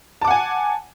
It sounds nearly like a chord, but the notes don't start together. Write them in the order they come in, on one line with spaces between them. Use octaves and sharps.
A5 D6 F#5 G#5